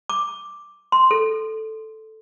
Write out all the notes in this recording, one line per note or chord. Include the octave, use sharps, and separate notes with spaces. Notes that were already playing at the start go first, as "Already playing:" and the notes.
D6
C6
A4